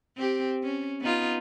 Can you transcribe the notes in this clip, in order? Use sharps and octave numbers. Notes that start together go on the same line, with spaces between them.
C4 G4
C#4
B3 D#4 F4